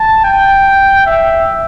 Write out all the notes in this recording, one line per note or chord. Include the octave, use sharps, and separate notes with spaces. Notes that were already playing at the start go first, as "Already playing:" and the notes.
Already playing: A5
G5
E5